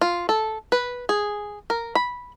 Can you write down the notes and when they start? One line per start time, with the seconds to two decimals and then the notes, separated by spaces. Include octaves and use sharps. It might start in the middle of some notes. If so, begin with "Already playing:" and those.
0.01 F4
0.29 A4
0.72 B4
1.09 G#4
1.70 A#4
1.95 B5